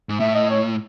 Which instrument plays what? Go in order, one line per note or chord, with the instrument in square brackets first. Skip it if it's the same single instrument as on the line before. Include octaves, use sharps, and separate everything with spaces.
[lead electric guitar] G#2
[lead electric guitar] A2 [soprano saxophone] E5
[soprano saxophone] D#5
C#5